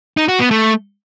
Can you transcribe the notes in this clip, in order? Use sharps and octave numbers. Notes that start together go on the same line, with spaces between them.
D#4
F#4
B3
A3